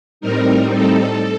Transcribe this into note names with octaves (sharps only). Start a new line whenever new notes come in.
A2 G3 C4 D#4 A#4
A4